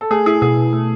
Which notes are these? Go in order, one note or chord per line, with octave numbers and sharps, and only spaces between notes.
A4
A3 G#4
E4 G#4
B2 G#4
B2
A3